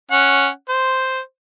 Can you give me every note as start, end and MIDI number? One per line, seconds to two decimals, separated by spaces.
0.11 0.48 61
0.11 0.48 78
0.69 1.20 72